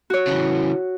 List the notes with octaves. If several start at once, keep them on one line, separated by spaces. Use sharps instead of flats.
F#4 C#5
C#3 E3